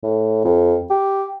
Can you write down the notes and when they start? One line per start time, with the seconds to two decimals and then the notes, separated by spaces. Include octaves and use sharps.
0.03 A2
0.44 F2
0.90 G4